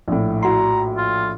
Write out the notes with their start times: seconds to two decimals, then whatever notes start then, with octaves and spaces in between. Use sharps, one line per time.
0.08 A#1 A2
0.43 E4 F#4 A#5 C6
0.97 F4